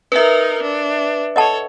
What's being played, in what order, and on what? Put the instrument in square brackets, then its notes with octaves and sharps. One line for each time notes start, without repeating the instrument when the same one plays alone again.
[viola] D#4 A#4 [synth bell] B4 E5
[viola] D4
[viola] A4 C#5 [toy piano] D#5 F#5 A5